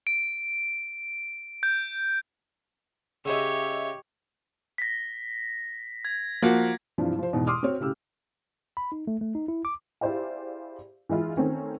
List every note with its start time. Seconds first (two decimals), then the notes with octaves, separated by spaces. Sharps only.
0.07 D7
1.63 G6
3.25 C#3 G4 C#5 D#5 E5 E6
4.78 A#6 B6
6.05 G#6
6.42 F3 A#3 F#4
6.98 G2 C3 E3 F3
7.19 F3 C5
7.33 E2 G#2 B2
7.47 C6 D6 D#6 F6
7.63 C4 F#4 C#5
7.80 A2 C#3 G4 E6
8.77 B5
8.92 D#4
9.07 A3
9.21 A3
9.35 D#4
9.48 E4
9.65 D6
10.01 E4 G4 G#4 C5 D5 F5
11.09 E3 G#3 E4 F4
11.37 D#3 A3 C4 C#4